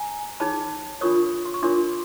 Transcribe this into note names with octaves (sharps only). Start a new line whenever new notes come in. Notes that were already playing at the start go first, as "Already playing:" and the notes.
Already playing: G#5 A#5
D#4 G#4 C#5 A5 B5
D4 F4 A#4 C#5 C#6 D#6
C6
C#6
D4 F4 A#4 C#5 C6 D6